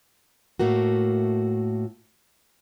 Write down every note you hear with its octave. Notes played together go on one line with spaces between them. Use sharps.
A2 A3 A#3 F#4